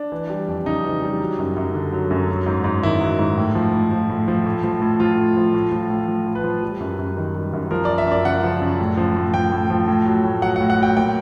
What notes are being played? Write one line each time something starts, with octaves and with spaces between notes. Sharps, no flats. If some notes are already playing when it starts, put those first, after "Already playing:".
Already playing: D4
E3
G3
F2
C#3 D#4
E3
G3
F#3
F#2
F#2
D3
F#3
F#2
F#3
G#2
G#2
D#3 E4
F#3
G#2
A2
F3
A2
F3
A2
F3
A2
F3
A2
F3 F4
A2
F3
A2
F3
A2
F3
A2
B4
F3
G3
F#2
F#2
D#3
G3
F#2
F3 A#4
F#2 D5
E5
F#2
D5
C#3 F#5
F3
F#2
A2
F3
A2
F3 G5
A2
F3
A2
F#3
A2
F#3 F#5
A2 F#5
F#5
F#3 G5
A#2 G5